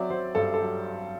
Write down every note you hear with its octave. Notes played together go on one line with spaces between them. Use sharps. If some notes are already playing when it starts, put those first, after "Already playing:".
Already playing: F#3 C4 D5 E5
F#3 C5
G2 A4
A4
F#3